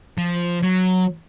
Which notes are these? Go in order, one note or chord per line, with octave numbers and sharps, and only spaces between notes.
F3
F#3